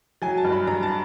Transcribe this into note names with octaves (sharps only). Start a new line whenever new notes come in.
F#3 G#5
A5
G2
B5
G2 A#5
A5